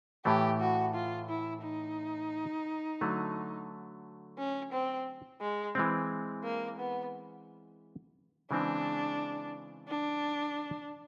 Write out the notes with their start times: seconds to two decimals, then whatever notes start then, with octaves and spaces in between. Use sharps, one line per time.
0.25 A2 E3 A3 G4
0.61 F#4
0.95 F4
1.29 E4
1.63 D#4
3.01 D3 F#3 A3
4.38 C#4
4.73 C4
5.41 G#3
5.75 E3 G#3 C4
6.44 A#3
6.79 B3
8.51 C#3 E3 G#3 C4 D4
9.88 D4